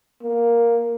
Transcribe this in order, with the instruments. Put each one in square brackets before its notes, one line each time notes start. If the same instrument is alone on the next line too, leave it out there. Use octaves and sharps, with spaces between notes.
[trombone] A#3